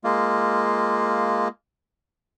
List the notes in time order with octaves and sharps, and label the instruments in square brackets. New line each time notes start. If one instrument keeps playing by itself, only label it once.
[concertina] G#3 A#3 F4